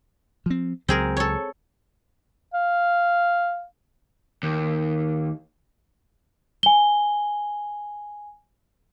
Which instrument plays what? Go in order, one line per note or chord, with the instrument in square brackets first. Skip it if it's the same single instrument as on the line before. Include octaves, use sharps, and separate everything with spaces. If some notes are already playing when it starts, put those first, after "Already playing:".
[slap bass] F3 C4
[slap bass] C#2 F#3 [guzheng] C4 G#4 A#4
[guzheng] A4 C#5
[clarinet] F5
[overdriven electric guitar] D#2
[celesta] G#5 G7